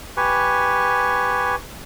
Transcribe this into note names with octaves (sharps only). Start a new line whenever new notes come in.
G4 B4 G#5 C#6